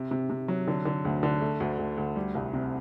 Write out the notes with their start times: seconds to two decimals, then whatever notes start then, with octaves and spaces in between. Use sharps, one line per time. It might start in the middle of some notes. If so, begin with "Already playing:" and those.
Already playing: C3
0.11 C3
0.30 C3
0.48 F#3
0.67 D3
0.85 D3
1.05 D2
1.23 D3
1.41 A3
1.60 D2
1.78 D2
1.98 D2
2.16 G3
2.35 C2
2.53 C3